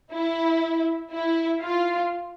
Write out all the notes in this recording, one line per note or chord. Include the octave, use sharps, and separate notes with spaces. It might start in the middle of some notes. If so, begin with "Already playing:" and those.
E4
E4
F4